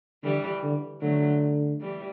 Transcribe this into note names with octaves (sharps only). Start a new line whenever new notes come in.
D3 E3 G3
D3
D3 F#3 A3
E3 G3